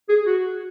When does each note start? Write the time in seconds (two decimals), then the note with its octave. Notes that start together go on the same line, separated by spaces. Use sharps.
0.09 G#4
0.26 F#4